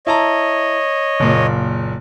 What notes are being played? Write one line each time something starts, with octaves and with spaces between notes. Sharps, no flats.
E4 C#5 D#5 A5 A#5
F#1 A#2